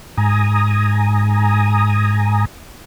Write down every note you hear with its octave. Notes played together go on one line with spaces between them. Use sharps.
G#2 G#5 A#5 D#6